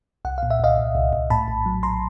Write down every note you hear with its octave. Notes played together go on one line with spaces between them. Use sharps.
C2 F#5
A#2 F5
E5
C2 D#5 F5
C2
C2
C2
A2 A5 B5
A#1
F#3
A#1 A#5 C6